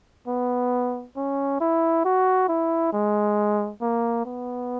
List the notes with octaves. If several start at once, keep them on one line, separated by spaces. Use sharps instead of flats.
B3
C#4
E4
F#4
E4
G#3
A#3
B3